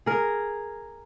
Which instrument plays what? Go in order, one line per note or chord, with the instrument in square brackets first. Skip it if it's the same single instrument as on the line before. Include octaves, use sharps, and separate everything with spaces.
[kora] G#4 A#4